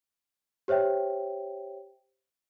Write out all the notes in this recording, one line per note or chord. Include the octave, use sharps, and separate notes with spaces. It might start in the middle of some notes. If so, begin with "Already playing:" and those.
G4 C5 C#5 E5 G5